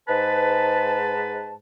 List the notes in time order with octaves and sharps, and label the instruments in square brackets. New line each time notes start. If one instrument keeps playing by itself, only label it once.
[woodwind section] G#2 B4 A5